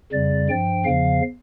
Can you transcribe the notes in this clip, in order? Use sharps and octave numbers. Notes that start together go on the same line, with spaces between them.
F2 C#3 G3 D5
G2 F3 G5
E2 C#3 F3 F5